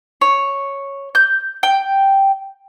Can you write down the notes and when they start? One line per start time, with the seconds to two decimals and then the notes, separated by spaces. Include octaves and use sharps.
0.21 C#5
1.15 G6
1.63 G5